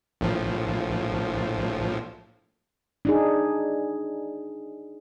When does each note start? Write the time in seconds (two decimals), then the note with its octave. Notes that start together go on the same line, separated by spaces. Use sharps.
0.21 A#1 A2 F3
3.05 D4 D#4 G#4